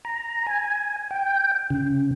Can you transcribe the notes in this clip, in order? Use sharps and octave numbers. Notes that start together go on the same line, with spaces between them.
A#5
G#5
G5
C#3